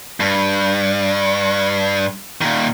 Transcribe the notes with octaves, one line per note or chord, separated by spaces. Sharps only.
G2
A#2 D#3